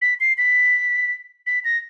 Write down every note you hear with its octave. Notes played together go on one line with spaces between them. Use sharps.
B6
C7
B6
B6
A#6